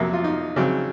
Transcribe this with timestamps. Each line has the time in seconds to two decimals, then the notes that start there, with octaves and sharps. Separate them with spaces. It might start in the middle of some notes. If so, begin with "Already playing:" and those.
Already playing: F2 C3 F#3 A#3
0.13 F4
0.24 D#4
0.56 C#3 F#3 C4